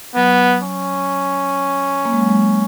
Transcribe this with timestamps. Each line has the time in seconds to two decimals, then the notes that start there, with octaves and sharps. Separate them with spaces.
0.16 F#3 B3
0.63 C#4
2.05 A#3
2.13 G#3
2.21 F#3
2.29 G#3